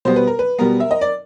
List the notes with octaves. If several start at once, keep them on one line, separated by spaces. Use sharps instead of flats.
B2 G3 B3 C5
B4
A#4
B4
B2 G3 B3 A#4
E5
D#5
D5